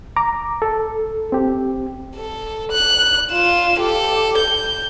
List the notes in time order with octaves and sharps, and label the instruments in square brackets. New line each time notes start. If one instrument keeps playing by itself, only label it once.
[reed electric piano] A#5 D6
A4
C4 G4
[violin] A4
F#6
F4 E7
G4 A4
G6